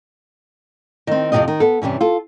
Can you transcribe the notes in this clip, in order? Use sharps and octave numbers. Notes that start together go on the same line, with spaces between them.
D#3 C4
F2 C3 D#3 F3 C4 D#5
D#3
B3 A4
G2 C3 E3 C#4
F4 A4